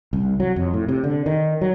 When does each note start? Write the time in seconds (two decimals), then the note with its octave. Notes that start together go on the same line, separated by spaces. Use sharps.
0.13 C2
0.40 F#3
0.56 F2
0.74 A2
0.88 C3
1.04 D3
1.26 D#3
1.61 F#3